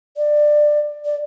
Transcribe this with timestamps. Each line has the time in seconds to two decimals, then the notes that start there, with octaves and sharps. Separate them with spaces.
0.17 D5
1.05 D5